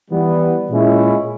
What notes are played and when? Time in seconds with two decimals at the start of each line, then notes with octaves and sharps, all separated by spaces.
0.10 E3 G3 B3
0.69 A#2 G#3 C#4 E4